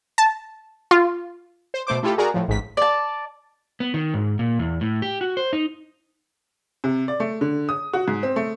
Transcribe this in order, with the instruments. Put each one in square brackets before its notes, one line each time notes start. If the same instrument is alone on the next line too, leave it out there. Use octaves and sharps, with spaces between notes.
[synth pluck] A5
F4
[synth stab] C5
B2 A3 C5 D6
A3 E4 F4 G4 A4
F#4 G#4 A#4 D5 A#5
A2 F3
A1 G#2 B6
[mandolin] D5 A5
[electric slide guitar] B3
D#3
G#2
A#2
E2
A2
G4
F#4
C5
D#4
[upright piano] C3
D5
A3
D3
D#6
F#4
G#2
C4
A3